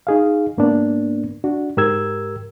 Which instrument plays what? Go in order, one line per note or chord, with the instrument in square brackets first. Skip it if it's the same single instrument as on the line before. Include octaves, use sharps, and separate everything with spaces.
[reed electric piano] D#4 G#4 F5
G#2 A#3 B3 D4
D4 F#4
G#2 G4 A#4 E6 G#6